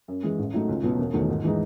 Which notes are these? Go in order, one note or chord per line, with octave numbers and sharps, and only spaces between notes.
F#2
E3 G#3
A1
A2 F#3 A3 D#4
C#2
B2 F#3 B3
E1
E2 D#3 F#3 A3
G#2
E3 G#3 D#4